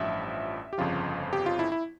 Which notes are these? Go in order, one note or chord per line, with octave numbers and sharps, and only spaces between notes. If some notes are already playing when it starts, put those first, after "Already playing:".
Already playing: A1 G2 F3 E5
G4
G1 F2 C#3 F3 F4
G4
F4
E4
E4